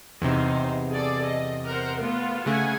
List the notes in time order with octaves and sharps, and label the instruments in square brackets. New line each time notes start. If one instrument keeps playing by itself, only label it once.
[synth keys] E2 C3 [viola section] D#4 C5
[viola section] G#4 A4 D5
D#5
A#4 C5 F#5
A3 B3 F4
[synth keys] C#3 A3 [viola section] G#4 F#5 G#5